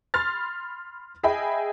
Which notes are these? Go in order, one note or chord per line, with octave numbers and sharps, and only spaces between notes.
B5 C6 F6 A6
G#4 D#5 E5 G5 G#5 B5